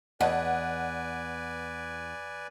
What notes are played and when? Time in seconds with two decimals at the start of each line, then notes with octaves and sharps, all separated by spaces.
0.21 E2 B4 D5 D#5 F#5 G#5